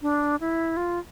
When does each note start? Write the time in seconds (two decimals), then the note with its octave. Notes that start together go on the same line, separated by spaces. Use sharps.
0.02 D4
0.41 E4
0.77 F4